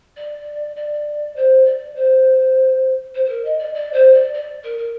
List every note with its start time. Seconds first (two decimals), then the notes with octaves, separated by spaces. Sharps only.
0.16 D5
0.76 D5
1.36 C5
1.65 D5
1.95 C5
3.14 C5
3.25 C5
3.29 A#4
3.44 D#5
3.59 D5
3.74 D5
3.93 C5
4.13 D5
4.33 D5
4.63 A#4
4.78 A#4